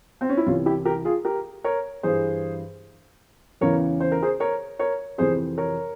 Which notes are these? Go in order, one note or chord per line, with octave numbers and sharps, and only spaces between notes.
C4
C#4
E4
C2 C3 E3 C#4 F4
E4 G4
G4 A#4
F4 G#4
G4 A#4
A#4 C#5
G2 E3 G#4 C5
E2 C#3 E3 A#4 C#5
C5
A#4
G#4 C5
A#4 C#5
A#4 C#5
F2 C3 E3 G#4 C5
A#4 C#5